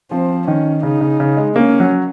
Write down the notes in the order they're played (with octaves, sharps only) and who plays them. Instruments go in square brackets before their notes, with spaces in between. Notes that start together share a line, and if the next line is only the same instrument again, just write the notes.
[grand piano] F3 [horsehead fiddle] C4
[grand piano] D#3 [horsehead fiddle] C#4
[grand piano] C#3 [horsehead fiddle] D#4
[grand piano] C#3
C#3
G#3
[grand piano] A#3 [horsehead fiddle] C#4
[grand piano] F#3